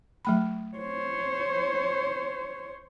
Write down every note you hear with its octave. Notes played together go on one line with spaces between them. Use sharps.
F#3 A3 B5
C5 C#5